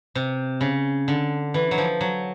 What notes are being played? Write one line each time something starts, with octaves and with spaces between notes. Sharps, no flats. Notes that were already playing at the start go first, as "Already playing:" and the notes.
C3
C#3
D3
E3
F#3
F3
F#3